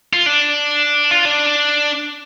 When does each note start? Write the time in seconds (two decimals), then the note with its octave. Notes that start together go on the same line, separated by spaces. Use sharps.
0.13 F4
0.26 D4
1.11 F4
1.25 D4